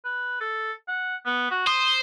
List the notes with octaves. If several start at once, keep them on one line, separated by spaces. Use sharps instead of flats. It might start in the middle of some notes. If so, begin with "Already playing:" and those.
B4
A4
F#5
B3
F#4
C5 D#6